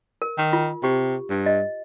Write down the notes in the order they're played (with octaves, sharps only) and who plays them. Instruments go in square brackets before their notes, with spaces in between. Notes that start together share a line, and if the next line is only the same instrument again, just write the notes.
[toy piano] A#4
[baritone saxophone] D#3
[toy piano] F4
[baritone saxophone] C3 [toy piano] G4
[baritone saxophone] G2
[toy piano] D#5